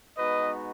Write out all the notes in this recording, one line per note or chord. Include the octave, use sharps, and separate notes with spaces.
G#3 B3 D#4 F#4 B4 D#5